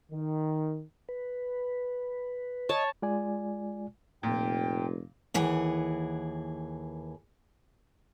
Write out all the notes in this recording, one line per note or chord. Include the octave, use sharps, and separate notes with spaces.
D#3
B4
C#5 D#5 A5
G#3 F4 D5 G#5
F1 A#2 G5
D#2 E3 G#4 F#5